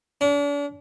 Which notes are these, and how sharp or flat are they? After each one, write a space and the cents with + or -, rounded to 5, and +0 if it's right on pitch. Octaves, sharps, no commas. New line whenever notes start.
D4 -40